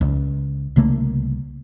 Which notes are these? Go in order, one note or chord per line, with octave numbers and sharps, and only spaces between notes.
C#2
C2 C#3 A3 A#3